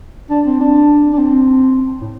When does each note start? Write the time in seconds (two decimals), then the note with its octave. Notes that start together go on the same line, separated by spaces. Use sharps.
0.30 D4
0.46 C4
0.60 D4
1.13 D4
1.18 C4
2.01 A2